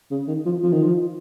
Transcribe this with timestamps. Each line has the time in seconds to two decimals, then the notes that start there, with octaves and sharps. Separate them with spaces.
0.11 C#3
0.28 D#3
0.46 F3
0.63 F3
0.72 D#3
0.83 F3